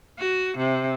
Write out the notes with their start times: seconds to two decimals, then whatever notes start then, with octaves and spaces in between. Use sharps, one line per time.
0.18 F#4
0.56 C3